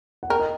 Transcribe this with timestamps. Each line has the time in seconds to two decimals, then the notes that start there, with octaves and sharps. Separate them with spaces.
0.23 F#5
0.30 A#4 G5
0.40 D#5